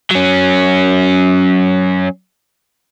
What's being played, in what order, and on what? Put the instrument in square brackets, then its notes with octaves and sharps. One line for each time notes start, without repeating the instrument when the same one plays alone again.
[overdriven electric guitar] F#3 C#4